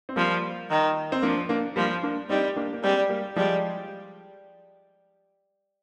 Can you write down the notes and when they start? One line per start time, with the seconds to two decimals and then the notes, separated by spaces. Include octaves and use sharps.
0.09 C4
0.16 F3 G3 A#3
0.70 D#3
1.12 C4
1.22 F3 A#3 D4
1.49 A#3 D4
1.76 F3 G3 A#3
2.03 A#3 D4
2.29 G3 C4 D#4
2.56 A#3 D4
2.73 A#3
2.83 G3 G#3 C4
3.09 G3 A#3
3.36 F3 G3 G#3